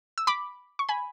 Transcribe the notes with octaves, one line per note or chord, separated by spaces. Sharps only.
E6
B5 D6
C#6
G#5 B5